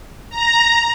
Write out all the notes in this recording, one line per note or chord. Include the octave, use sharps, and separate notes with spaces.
A#5